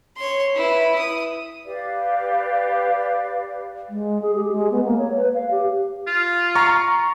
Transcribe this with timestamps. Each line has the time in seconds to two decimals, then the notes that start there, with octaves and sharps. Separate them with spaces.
0.17 C#5 C6
0.56 E4 B4
0.98 D#6
1.66 G4 B4 D5 F5
3.89 G#3
4.22 G#4
4.35 G4
4.52 G#3
4.72 B3
4.84 A#3
4.98 C#5
5.17 B4
5.34 F5
5.51 G4
6.07 F4
6.55 A#5 C#6